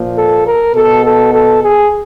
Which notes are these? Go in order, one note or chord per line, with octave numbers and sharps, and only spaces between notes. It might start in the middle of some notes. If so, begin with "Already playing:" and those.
Already playing: A#2 F3
A4
A#4
B2 A4
A4
A4
G#4